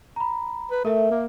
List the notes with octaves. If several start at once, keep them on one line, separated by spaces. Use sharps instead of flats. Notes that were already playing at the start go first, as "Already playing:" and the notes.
A#5 B5
B4
A3 A#4 E5
A#3